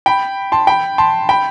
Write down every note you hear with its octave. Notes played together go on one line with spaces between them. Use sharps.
G5 B5
A5 C6
G5 B5
A5 C6
G5 B5